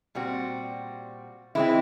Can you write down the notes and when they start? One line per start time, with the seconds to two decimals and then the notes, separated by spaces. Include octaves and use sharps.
0.15 A#2 G3 C4 F#4
1.55 E3 G#3 C4 E4